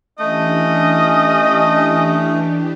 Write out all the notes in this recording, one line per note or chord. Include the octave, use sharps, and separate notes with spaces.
E3 A3 C#4 D4 G4 D#5